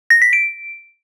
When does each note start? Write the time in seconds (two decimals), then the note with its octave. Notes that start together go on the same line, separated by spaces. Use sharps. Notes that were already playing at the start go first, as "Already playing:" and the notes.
0.10 A#6
0.22 B6
0.33 D7